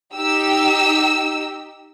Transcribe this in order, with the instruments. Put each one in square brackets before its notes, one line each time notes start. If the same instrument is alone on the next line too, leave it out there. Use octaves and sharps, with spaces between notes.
[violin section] D#4 G4 E6